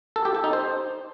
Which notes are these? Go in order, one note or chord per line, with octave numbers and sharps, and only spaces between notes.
A4
G4
A4
D#4
C5